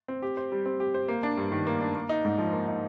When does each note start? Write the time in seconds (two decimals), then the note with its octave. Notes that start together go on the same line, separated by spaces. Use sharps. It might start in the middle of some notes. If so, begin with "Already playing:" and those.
0.08 C4
0.22 G4
0.37 C5
0.52 G3
0.66 C4
0.80 G4
0.94 C5
1.08 A#3
1.23 D4
1.37 G2
1.52 D#3
1.67 A#3
1.81 D4
1.95 A#3
2.09 D#4
2.25 G#2
2.38 F3
2.53 A#3
2.67 D#4